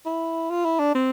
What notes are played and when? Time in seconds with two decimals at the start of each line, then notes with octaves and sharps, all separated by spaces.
0.06 E4
0.50 F4
0.65 E4
0.79 D4
0.95 C4